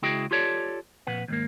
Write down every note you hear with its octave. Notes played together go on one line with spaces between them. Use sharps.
C#2 E4 F#4 G#4 D#5 G5
F4 G4 A4 C#5 D5
F2 A#2 B4 F#5
D#2 G#2 A#3